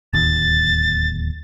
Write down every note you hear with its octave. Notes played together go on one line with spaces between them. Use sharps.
D1 D#2 A6